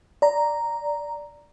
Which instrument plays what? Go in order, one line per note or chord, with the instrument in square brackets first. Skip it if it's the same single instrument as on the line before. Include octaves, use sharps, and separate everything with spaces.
[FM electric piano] D5 A#5